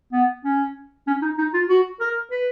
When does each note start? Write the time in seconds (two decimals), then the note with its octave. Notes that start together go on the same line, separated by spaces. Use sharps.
0.12 B3
0.44 C#4
1.07 C#4
1.22 D#4
1.38 D#4
1.54 F4
1.69 F#4
2.00 A#4
2.31 B4